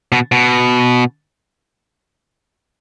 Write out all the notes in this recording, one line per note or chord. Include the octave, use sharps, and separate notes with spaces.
B2
B2